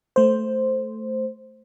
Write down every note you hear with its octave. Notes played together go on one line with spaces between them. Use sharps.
A3 C5